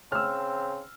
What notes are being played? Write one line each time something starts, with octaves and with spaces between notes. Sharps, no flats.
C#3 C4 E6 F6